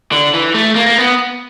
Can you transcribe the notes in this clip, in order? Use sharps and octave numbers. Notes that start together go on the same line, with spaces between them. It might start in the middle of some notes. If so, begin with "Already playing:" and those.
D3
E3
A3
A#3
A#3
B3